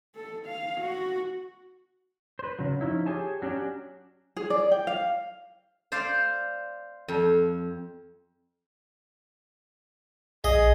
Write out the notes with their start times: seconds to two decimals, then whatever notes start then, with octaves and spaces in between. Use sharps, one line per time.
0.16 A4
0.46 F5
0.81 F#4
2.39 B4 C5
2.59 C#3 F#3
2.81 F3 C#4 D#4 E4
3.06 G4 G#4 C#5 G#5 A5
3.42 F#3 C#4 D4 G4
4.37 G#4
4.50 D5
4.72 G5
4.87 F5
5.92 C5 D5 F5
7.08 F2
10.44 A#1 G#4 D#5